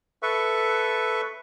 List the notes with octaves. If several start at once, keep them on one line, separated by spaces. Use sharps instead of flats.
A4 B4 E5 C#6